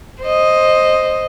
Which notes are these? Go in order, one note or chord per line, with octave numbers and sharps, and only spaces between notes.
C5 D#5